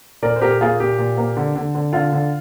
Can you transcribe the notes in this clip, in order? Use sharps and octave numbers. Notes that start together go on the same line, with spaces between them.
A#2 A#4 D5
C5
A#2 G4 A#4
A#3 F4 G#4
A#2 G4
A#2
A#3
D3
D3
D3
D3 F4
D3